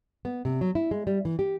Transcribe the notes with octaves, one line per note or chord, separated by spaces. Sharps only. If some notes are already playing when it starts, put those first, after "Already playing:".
B3
C3
F#3
E4
G#3
G3
E3
G4